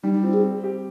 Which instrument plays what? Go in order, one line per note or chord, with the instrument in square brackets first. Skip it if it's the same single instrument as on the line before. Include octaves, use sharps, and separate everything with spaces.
[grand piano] G3 [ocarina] D#4
[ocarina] D#4
[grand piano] C4 [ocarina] F4
[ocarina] G#4
[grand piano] C4
G4